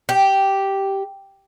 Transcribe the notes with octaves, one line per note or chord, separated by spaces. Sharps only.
G4